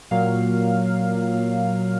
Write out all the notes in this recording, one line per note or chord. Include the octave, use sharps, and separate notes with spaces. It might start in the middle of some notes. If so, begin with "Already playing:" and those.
A#2 F#3 A#3 F5